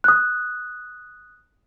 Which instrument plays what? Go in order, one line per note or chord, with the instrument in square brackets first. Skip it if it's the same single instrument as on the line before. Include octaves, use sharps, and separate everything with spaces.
[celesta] D#6 F#6